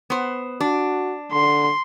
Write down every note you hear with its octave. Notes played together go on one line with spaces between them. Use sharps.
B3 C5
D4 F#4
D3 C6